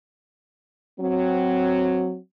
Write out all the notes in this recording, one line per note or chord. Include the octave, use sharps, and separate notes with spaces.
F#3 C4